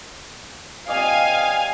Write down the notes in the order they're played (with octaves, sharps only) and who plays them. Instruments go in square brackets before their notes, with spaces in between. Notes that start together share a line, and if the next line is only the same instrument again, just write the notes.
[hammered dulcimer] C3 D5 D#5 [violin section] F5 G#5